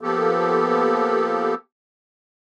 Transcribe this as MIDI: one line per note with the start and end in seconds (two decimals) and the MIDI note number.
0.01 1.54 53
0.01 1.54 58
0.01 1.54 59
0.01 1.54 67
0.01 1.54 69